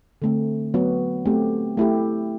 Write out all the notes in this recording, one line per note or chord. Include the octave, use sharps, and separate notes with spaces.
D3 A3 C4
F#3 B3 F#4
A3 C4 G4
A3 E4 G4